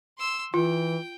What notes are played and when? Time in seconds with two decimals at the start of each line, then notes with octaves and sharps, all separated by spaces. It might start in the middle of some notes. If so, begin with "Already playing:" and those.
0.18 C6 E6
0.54 E3 F4 G5